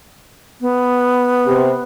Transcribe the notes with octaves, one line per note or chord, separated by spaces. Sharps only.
B3
C3